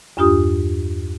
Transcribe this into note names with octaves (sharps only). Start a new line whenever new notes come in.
E2 G2 D4 F4 G4 D#6